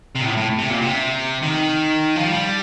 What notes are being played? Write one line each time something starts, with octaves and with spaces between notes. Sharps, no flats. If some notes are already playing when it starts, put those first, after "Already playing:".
C3
A#2
A2
A2
C3
A#2
C3
D#3
F3
G3